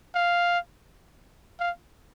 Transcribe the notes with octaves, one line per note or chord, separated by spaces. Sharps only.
F5
F5